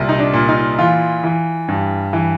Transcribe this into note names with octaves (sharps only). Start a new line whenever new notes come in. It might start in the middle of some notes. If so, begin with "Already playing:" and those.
Already playing: C2 A#2
D#4
D4
A#2
D#4
E3 F4
E3
G2
E3